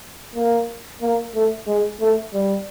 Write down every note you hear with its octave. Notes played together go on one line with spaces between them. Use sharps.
A#3
A#3
A3
G#3
A3
G3